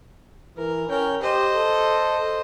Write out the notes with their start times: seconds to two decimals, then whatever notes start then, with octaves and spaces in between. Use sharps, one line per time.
0.57 E3 A#4
0.89 C#4 A#4 G5
1.21 G4 C5 D#5
1.54 A4